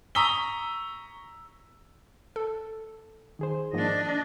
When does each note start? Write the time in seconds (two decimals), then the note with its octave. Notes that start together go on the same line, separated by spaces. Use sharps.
0.15 A#5 C#6 D#6 E6 B6 G7
2.36 A4
3.39 D#3 G#4 C5
3.73 G#2 F3 A#3 D4 D#5